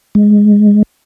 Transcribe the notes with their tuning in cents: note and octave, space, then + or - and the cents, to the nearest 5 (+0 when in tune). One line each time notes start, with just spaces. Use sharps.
G#3 +0